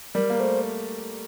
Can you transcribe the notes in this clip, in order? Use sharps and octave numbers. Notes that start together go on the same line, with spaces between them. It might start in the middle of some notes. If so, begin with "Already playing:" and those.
G3 A#4
A#3
A3 C5